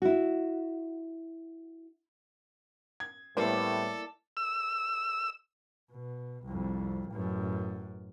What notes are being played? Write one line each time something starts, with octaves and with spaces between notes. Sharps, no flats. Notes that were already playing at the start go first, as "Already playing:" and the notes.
E4 F#4
G#6
A2 G3 A#3 B3 E4 A4 C5 D5
E6
B2
C2 F2
A1 F#2